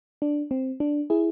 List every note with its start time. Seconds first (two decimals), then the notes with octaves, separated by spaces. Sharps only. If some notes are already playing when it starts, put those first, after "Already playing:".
0.22 D4
0.51 C4
0.80 D4
1.10 E4 G#4